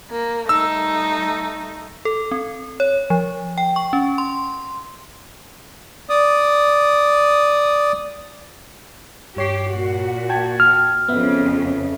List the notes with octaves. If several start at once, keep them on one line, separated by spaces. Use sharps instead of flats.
A#3
G3 A3 D#4 E6
A4
C4
C#5
F3
G5
C#6
C#4
C6
D5 D#6
G2 G4 C#5 C7
A#2 F#4
G5 A5 G#6
F6
F2 C#3 B3 E5